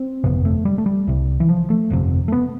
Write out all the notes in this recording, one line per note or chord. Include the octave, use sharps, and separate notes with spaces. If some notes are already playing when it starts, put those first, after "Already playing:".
Already playing: C4
G1 F2 C3 B3
A3
G3
A3
G3
C2 C3
E3
F3
A3
G1 F2 C3
A3
B3